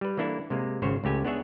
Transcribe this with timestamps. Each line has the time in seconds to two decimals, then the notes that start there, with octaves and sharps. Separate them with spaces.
0.01 G3 B4
0.17 E3 A#3 D4 E4 A4
0.50 C3 G#3 A#3
0.82 G#1 C#3 C5 C#5
1.04 C#2 A3 G4 G#5
1.24 B3 D4 G#4 C#5 E5 F#5